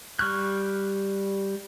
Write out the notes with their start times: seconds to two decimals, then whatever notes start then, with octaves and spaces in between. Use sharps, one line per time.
0.19 G3 C#6 F6 F#6